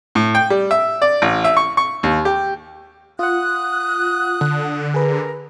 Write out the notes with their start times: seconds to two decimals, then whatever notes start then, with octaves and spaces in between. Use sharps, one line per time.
0.15 A2
0.35 G5
0.50 G3
0.71 E5
1.02 D5
1.22 A1
1.44 E5
1.57 C#6
1.77 C#6
2.03 D#2
2.25 G4
3.19 F4 F#5 D#6 F#6
4.41 D3
4.94 G#4 A#4 B4